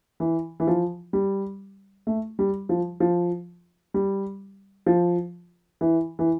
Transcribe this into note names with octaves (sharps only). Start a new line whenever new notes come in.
E3
E3
F3
G3
A3
G3
F3
F3
G3
F3
E3
E3